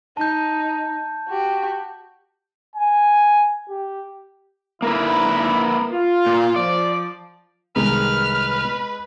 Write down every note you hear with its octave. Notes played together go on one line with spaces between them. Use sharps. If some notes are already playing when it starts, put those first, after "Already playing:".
D#4 A5 G6
F#4 G4
G#5
G4
D3 A#3 D#4 E4 A#4 B4
F4
A#2
F3 D5
C2 D#3 G#3 D#4 B4 F6